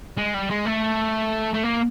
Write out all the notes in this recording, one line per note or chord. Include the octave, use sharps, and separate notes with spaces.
G#3
G3
G#3
A3
A3
A#3